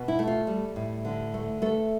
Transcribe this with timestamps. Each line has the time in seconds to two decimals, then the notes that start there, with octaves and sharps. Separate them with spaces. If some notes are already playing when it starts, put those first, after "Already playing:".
Already playing: B2
0.08 E4
0.19 A3
0.27 F4
0.47 G3
0.76 A2
1.05 D3
1.34 A3
1.62 A3 A4